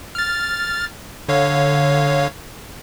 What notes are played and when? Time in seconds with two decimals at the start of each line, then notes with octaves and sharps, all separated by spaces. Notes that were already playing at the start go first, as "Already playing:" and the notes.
0.15 F6 A6
1.29 D3 C#5 F5